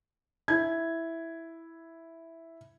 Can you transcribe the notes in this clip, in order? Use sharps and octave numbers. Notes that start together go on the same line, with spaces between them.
E4 G#6